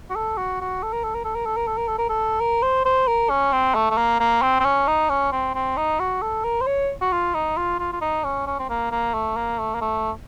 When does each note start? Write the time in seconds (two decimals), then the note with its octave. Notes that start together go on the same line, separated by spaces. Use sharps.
0.10 F#4
0.16 A4
0.38 F#4
0.61 F#4
0.83 A4
0.93 A#4
1.04 A4
1.15 A#4
1.24 A4
1.35 A#4
1.46 A4
1.56 A#4
1.67 A4
1.77 A#4
1.88 A4
1.98 A#4
2.09 A4
2.40 A#4
2.63 C5
2.85 C5
3.08 A#4
3.30 C#4
3.52 C4
3.75 A3
3.90 A3
3.97 A#3
4.20 A#3
4.42 C4
4.60 C4
4.65 C#4
4.87 D#4
5.10 C#4
5.32 C4
5.55 C4
5.77 D#4
5.99 F#4
6.22 A4
6.44 A#4
6.61 C5
6.67 C#5
7.01 F#4
7.12 F4
7.34 D#4
7.57 F4
7.80 F4
7.93 F4
8.02 D#4
8.24 C#4
8.47 C#4
8.59 C4
8.69 A#3
8.91 A#3
9.14 A3
9.37 A#3
9.59 A3
9.75 A#3
9.81 A3